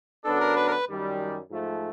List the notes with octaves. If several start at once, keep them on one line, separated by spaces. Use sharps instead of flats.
F#2 D3 F#3 B3 D4 A4
A#4
B4
A#4
B4
F#2 D#3 G3
G#2 F3 A3